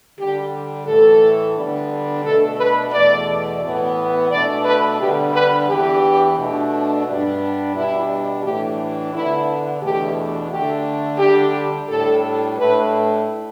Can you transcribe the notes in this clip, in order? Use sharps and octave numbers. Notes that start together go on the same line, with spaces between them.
D3 G3 D4 G4
A2 E3 A3 A4
D3 G3 B3 D4
B2 A3 D4 A4
B4
E2 B2 A3 D5
A2 E3 B3
B2 A3 D4 D5
B4
D3 G3 B3 D4 G4
B4
E2 E3 B3 D4 G4
B2 A3 D4
G2 G3 B3 D4
B2 G3 D4 E4
A2 E3 A3 D4 G4
D3 B3 D4 E4
E2 B2 A3 D4 G4
D3 A3 D4 G4
D3 G3 D4 G4
A2 G3 D4 A4
A2 A3 D4 B4